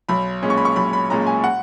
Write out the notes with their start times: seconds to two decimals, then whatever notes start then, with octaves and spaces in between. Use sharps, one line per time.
0.09 B1 B5
0.43 A#2 G#3 C#4
0.50 C#6
0.57 B5
0.65 C#6
0.76 B1 B5
0.93 B5
1.10 A#2 G#3 C#4 A#5
1.26 G#5
1.44 F#5